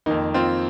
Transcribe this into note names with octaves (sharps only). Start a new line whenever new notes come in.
F2 D#3 A#3 D#4
C4 F4